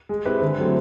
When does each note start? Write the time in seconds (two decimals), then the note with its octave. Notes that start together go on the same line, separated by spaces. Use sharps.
0.09 G#3
0.25 C4 E4 G4 B4
0.42 D3
0.58 F#3 A3 C4